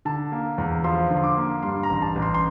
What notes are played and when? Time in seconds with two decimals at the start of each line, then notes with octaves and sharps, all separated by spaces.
0.05 D3 A5
0.32 A#3
0.58 E2
0.84 F3 C6
1.11 D3
1.17 C6
1.24 D6
1.37 A#3
1.63 G2 C6
1.83 A#5
1.90 A1
2.02 A5
2.16 A1
2.22 C6
2.34 C6